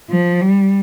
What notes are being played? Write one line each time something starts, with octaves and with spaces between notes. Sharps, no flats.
F3
G3